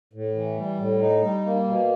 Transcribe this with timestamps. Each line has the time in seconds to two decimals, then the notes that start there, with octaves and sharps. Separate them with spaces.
0.13 A2
0.35 E3
0.57 G3
0.78 A2
1.02 D#4
1.23 G3
1.46 A#3
1.68 B2